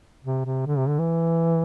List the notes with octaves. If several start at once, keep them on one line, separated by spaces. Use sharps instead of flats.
C3
C3
D3
C3
D3
E3